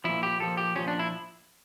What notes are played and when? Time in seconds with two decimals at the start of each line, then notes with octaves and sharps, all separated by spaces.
0.04 A#2 F3 E4
0.23 G4
0.40 A#2 F3 A4
0.57 G4
0.76 A#2 F3 C#4
0.88 D4
0.99 E4